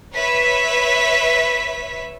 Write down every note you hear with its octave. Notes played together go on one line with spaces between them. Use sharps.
B4 C#5 E5 B6